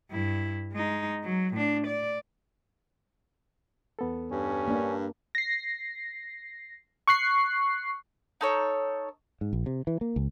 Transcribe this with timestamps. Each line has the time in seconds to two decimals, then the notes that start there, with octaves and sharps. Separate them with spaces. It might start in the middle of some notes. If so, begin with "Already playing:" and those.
0.11 G2 E4
0.72 G#3 D#4
1.24 F#3
1.55 A2 D4
1.87 D5
3.99 E2 B3 A4
4.31 G2 C#4
4.68 A#3 D4
5.35 A#6 C7
7.08 C#6 F#6 C7
8.41 D#4 A4 C#5
9.41 G#2
9.53 A#1
9.66 C3
9.87 E3
10.01 A#3
10.16 C#2